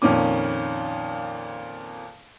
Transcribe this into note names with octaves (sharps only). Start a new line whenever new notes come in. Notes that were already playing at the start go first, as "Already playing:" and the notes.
F2 A#2 D#3 C#4 D6